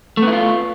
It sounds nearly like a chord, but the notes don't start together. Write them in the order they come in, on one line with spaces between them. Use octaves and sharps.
A3 B3 E4 F4